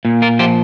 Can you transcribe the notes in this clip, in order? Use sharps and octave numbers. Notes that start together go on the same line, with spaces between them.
A#2
F4 A#4
F3 G4 C5